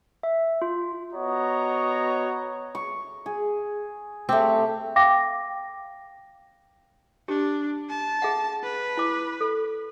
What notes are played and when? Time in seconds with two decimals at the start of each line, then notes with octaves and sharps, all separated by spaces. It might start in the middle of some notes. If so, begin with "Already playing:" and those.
0.23 E5
0.62 F4
1.13 B3 F#4 C#5 D#5 A#5
2.75 C#6
3.26 G#4
4.29 A3 C4 G4
4.96 F5 G5 D6 A#6
7.28 D4 G4
7.90 A5
8.22 G#4 E5 F#5
8.64 B4
8.97 E4 D6
9.41 A4